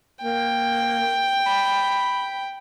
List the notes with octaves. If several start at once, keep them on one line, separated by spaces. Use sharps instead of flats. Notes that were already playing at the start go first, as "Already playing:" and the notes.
A#3 G5
B5